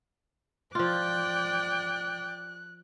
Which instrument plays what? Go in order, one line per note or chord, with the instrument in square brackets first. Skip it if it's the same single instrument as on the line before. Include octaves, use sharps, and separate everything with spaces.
[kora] F3 F4 [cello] D5 G5 [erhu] F#6